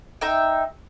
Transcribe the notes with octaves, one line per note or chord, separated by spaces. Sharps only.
D#4 E5 G5